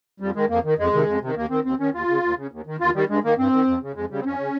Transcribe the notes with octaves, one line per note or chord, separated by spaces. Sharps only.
F2 G3
D#3 G#3
F2 A#3
D#3
F2 G#3
C3 D#3
F2
C3 D#3
D#2 A#3
D#3 C4
D#2 C4
D#3 C#4
D#2 F4
C#3
D#2
C#3
D#2
D#3
D#2 F4
D#3 G3
G2 G#3
D#3 A#3
G2 C4
D#3
F2
C#3
F2 G#3
C#3 G3
C4
F2 C#4
C#3